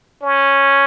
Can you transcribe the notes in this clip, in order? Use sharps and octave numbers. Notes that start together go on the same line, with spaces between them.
C#4